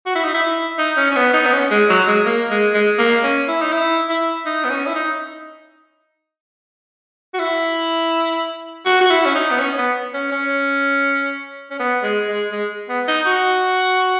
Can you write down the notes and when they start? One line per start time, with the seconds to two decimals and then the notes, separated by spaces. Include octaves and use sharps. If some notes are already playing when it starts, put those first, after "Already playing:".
0.06 F#4
0.15 E4
0.24 D#4
0.34 E4
0.79 D#4
0.97 C#4
1.11 C#4
1.16 B3
1.34 D#4
1.46 B3
1.53 C#4
1.71 G#3
1.90 F#3
2.08 G#3
2.26 A#3
2.50 G#3
2.74 G#3
2.99 A#3
3.23 C#4
3.48 E4
3.62 D#4
3.73 E4
4.09 E4
4.46 D#4
4.64 B3
4.70 C#4
4.87 E4
4.95 D#4
7.34 F#4
7.40 E4
8.86 F#4
9.01 F#4
9.10 E4
9.25 C#4
9.35 D#4
9.51 B3
9.59 C#4
9.78 B3
10.14 C#4
10.32 C#4
11.71 C#4
11.79 B3
12.03 G#3
12.28 G#3
12.52 G#3
12.89 B3
13.08 D#4
13.26 F#4